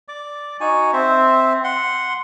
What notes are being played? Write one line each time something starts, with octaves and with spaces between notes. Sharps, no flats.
D5 D6
D#4 F#4 G#5
C4 C5 E5
F#5 C6